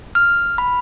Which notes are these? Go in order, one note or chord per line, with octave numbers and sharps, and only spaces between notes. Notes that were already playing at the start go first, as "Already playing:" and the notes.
F6
B5